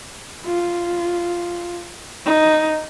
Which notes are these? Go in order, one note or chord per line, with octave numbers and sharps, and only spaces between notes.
F4
D#4